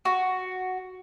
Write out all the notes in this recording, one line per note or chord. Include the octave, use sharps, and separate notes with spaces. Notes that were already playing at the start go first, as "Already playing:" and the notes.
F#4